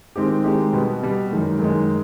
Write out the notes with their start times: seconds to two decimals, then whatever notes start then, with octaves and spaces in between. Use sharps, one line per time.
0.16 D#3 G#3 C4 D#4 G4
0.44 D#3 G#3 C4 D#4 G4
0.73 B2 G3 B3
1.02 B2 G3 B3
1.31 F#2 D#3 G#3
1.59 F#2 D#3 G#3